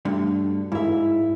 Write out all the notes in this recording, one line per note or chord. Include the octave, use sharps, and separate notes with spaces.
D2 G2 D3
G#2 E4 E5